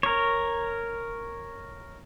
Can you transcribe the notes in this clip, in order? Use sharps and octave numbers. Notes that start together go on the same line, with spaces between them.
A#4 C#5